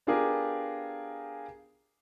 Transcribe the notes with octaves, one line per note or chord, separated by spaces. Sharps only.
B3 D4 F4 G4 G#4 A#4